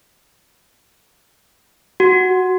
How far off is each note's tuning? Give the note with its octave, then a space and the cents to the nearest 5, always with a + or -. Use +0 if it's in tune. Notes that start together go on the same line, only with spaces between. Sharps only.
F#4 +0